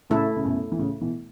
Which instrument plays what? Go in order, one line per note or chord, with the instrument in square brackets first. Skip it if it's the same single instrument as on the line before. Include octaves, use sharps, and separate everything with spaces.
[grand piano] A2 C#3 [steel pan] A3 E4 A4
[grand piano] C#3
F#2 B2
E3
A2 C#3
B2 E3